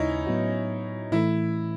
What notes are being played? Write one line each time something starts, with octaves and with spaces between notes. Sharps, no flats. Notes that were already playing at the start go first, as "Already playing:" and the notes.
Already playing: D#2 C#3 G#3 C#4 D#4 E4
A2 F#3 B3 F#4
A2 E3 A3 E4